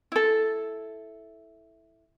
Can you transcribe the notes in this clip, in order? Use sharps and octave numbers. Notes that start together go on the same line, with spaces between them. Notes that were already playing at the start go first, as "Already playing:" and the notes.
E4 A4